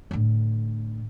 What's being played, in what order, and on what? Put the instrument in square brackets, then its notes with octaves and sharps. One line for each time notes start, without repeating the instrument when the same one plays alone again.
[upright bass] A2 D3